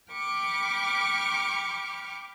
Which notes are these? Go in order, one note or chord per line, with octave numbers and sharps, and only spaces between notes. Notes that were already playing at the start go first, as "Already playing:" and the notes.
G5 B5 C#6 D6 F6